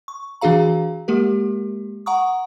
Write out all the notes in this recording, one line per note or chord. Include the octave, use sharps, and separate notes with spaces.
C#6
E3 D4 F#4 G#4 F5 A#5
G#3 A#3 G4 A#4
F#5 A#5 C#6 D#6